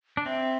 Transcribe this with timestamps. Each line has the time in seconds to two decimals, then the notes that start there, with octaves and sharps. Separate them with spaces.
0.17 D4
0.26 C4 E5